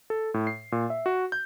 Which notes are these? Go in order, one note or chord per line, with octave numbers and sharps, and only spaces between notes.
A4
A2
C7
A#2
E5
F#4
G6